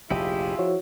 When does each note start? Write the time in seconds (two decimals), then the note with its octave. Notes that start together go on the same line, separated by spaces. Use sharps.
0.11 F1 A#1 E4 F4 G4 G#4 D#5 E5
0.59 F3 E4 F#4 C#5